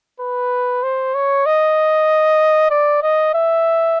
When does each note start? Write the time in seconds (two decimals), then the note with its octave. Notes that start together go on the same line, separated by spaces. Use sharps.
0.20 B4
0.83 C5
1.14 C#5
1.46 D#5
2.71 D5
3.03 D#5
3.34 E5